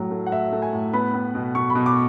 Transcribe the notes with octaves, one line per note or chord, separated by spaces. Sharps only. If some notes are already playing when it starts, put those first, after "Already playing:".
Already playing: A2 F#3
A3
F#5
A2 E5
A3
G#5
A2
B3 B5
B3
B2
B2 C#6
B5
B2
D6